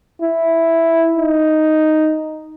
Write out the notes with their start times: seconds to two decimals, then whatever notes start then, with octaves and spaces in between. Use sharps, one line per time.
0.22 E4
1.16 D#4